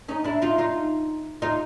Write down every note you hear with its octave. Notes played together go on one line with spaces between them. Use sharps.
C#4 D#4
D4 E4
D#4 F4
D#4 F4
D#4 F4